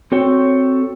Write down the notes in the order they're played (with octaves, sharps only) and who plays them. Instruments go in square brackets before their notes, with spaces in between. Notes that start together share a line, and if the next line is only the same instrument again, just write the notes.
[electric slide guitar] C4 F#4 A4 C#5 G5